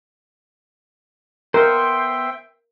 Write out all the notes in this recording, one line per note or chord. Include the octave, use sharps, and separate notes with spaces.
B3 A#4 C5 E5 G5